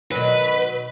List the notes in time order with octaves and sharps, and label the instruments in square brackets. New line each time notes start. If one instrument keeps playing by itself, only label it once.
[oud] B2 D#3 F#3 [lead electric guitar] B4